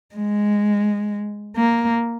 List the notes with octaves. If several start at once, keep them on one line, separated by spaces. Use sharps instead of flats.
G#3
A#3